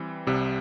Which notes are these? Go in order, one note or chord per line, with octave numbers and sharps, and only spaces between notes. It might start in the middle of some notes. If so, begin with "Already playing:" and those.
Already playing: E3 G3 C4
C2 C3 G3